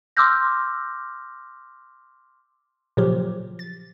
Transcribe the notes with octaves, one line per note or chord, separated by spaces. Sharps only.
C6 D6 E6 F6 G6 A#6
A#2 C#3 F3 F#3 G4
A6